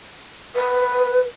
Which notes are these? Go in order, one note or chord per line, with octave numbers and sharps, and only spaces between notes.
B4